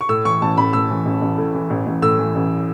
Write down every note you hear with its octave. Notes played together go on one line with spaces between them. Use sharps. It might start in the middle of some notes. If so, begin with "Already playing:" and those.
C#6
A2 E6
E3 C#6
A1 A5
A1 B5
A2 E6
E3
A1
A1
A2
E3
A1
A1
A2 E6
E3
A1